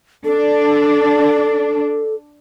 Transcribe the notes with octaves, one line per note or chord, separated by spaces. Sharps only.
D4 A4